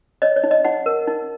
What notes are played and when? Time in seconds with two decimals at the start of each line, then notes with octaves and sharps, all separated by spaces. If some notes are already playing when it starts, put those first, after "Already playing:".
0.22 C#5 D#5
0.36 C#5
0.44 D#4
0.51 D#5
0.65 D#4 F#5
0.86 A#4
1.07 D#4